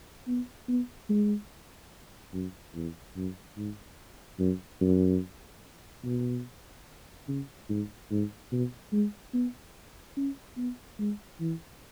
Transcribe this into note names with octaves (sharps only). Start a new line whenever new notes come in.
B3
B3
G#3
F#2
E2
F#2
G#2
F#2
F#2
B2
C#3
G#2
G#2
B2
G#3
B3
C#4
B3
G#3
E3